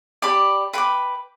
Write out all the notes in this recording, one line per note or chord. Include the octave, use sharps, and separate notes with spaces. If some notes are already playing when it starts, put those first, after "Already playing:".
G4 D5 B5 D6
B4 G5 B5 D6